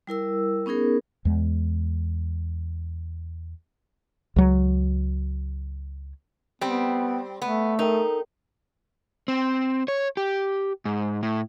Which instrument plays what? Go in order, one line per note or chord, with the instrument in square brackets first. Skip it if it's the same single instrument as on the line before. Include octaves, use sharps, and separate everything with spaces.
[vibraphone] G3 E4 A#4 E6
B3 C#4 D#4 G#4 A#4
[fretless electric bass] E2 G#3
C#2 F#3
[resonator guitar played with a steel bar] G3 C4 [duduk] B3
[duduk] A3 [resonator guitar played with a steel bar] B3
[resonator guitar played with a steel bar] D#4 [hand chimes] A4 A#4 G5
[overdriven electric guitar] C4
C#5
G4
G#2
A2